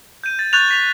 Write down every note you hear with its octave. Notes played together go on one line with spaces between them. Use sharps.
G6 D#7
A6
C#6 F#6 G6 A6 F7
A6 B6 F7